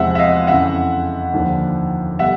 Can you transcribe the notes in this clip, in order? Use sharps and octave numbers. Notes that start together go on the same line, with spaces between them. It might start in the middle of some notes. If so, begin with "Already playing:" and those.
Already playing: E2 C3 F3 G#3 C4 E5 F#5
E5
D#5 F5
F2 C#3 E3 E5 F#5
D#2 D3 F3
B2 G3 E5 F#5